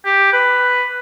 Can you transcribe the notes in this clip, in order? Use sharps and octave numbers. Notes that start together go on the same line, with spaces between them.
G4
B4